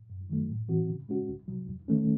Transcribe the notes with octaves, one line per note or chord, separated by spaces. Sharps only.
F#2
D#3 F#3 A3
A2
E3 C4 F#4
C#3
G#3 C#4 F#4
C2
C3 F#3
E2
D#3 A3 C#4